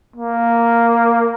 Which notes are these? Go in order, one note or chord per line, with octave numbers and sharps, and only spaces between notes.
A#3